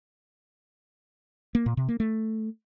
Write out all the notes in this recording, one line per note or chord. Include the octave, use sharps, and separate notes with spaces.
A#3
A#2
C3
A#3
A3